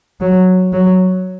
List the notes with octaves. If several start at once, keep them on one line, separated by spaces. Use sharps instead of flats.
F#3
F#3